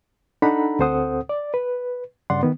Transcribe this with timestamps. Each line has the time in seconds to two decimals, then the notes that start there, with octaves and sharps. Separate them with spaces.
0.42 D4 D#4 A4 F#5 A#5 B5
0.79 D2 C4 A4 C5 F#5 D#6
1.29 D5
1.54 B4
2.30 G2 C#3 D5 F#5 C6
2.43 D#3 B3